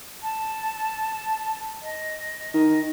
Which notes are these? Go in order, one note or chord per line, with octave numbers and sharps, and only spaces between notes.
A5
D#5
D#3 D#5